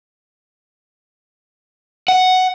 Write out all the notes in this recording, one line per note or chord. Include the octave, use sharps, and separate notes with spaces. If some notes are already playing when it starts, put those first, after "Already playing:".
F#5